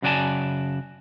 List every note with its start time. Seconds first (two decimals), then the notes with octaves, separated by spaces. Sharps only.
0.02 F#2 C#3 F#4 D5 G#5 A5